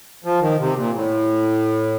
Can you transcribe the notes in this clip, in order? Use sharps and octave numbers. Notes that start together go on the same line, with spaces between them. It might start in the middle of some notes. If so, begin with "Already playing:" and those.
F3
D#3
C3
A#2
A2